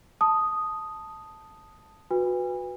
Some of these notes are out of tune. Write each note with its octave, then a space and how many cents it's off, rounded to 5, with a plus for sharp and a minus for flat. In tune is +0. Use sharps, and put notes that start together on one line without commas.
A5 +0 D#6 +0
F#4 -25 B4 +0 G#5 -40